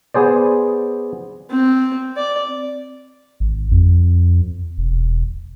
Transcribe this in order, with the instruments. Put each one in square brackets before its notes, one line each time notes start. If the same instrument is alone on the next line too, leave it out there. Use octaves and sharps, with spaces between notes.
[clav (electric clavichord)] B3 G#4 C5 D5
[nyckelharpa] C4
D5
[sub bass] G#1
F2
E1